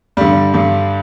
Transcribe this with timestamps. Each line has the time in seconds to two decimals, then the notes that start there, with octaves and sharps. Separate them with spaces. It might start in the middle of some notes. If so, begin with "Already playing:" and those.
0.17 G2 D3 G3
0.54 G2 D3